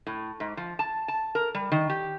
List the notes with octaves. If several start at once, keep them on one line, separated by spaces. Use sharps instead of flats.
A2
G#2
F3
A5
A5
A#4
G3
D#3
G4